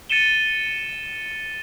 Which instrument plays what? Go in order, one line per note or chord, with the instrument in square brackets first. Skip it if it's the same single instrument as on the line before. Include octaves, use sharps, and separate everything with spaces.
[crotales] A6 C#7 D#7 E7 G7